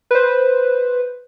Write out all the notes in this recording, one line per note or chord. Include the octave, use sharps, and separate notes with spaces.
B4 C5